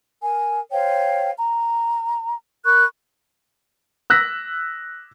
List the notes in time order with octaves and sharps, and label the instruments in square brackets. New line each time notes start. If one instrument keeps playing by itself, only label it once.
[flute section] A#4 G#5
C5 C#5 F5 G5
A#5
A#4 B5 C#6 F#6
[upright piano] E6 F#6 A#6 B6